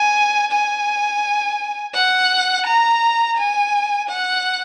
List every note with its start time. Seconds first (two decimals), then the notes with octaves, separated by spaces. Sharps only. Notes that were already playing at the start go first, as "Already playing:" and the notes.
Already playing: G#5
0.51 G#5
1.94 F#5
2.66 A#5
3.37 G#5
4.09 F#5